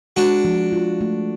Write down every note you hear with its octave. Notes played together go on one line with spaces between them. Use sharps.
G#3 D4 F#4
F3
F4
A3